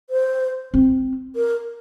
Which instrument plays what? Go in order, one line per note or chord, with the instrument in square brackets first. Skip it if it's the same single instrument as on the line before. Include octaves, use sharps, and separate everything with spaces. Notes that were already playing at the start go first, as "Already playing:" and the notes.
[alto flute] C5
[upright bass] C4
[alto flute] A#4